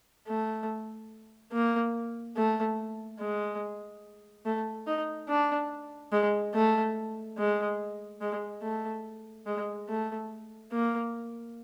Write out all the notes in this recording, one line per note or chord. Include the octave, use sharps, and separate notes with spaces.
A3
A#3
A3
G#3
A3
D#4
D4
G#3
A3
G#3
G#3
A3
G#3
A3
A#3